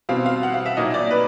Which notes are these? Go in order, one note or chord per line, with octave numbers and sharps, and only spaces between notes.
B2 G3 C4 F5
F5
F#5
F5
E5
A#2 F#3 A#3 D#4 D#5
D5
B4